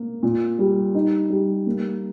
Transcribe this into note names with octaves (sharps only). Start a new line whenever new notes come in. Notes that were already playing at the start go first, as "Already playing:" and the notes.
Already playing: A#3
A#2
G3
D#4
G3
A#3